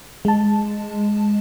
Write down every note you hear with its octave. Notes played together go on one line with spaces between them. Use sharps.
G#3 A5